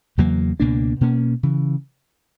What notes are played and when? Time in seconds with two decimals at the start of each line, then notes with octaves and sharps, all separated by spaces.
0.18 E2 C#3 F#3 A#3
0.60 C#2 B2 A#3 D4
1.01 B2 A#3 C#4
1.43 C#3 E3